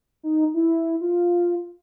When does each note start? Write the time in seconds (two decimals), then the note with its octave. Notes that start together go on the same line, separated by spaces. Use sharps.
0.23 D#4
0.54 E4
1.01 F4